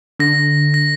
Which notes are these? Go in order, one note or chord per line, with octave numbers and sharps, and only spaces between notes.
D3 A#6
A#6